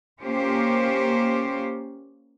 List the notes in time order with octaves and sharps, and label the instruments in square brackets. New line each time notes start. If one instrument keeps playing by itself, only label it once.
[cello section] A#3 C#4 F4 G4 C5